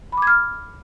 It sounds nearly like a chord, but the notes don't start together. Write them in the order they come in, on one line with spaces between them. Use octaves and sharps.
B5 D6 G#6 F6